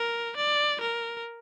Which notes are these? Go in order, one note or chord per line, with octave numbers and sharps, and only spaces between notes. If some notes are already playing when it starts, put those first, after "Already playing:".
Already playing: A#4
D5
A#4